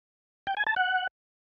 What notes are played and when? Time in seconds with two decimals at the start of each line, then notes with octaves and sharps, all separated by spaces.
0.47 G5
0.57 G#5
0.67 A5
0.76 F#5